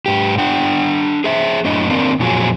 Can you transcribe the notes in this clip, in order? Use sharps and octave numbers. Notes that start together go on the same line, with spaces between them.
G#2 G4
D4 F#5 G5
G#4 C5 E5
F#2 A2 D4 D#5
D#3 A#3 C4 D4
F2 A#2 F3 F#3 E4 G#4